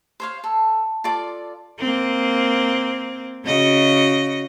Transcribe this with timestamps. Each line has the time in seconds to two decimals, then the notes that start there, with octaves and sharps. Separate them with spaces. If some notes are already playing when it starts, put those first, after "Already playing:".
0.20 C5 C#5 F5
0.44 A4
1.04 F4 A4 D5 D6
1.79 A#3 C4
3.45 C#3 F#4 D#5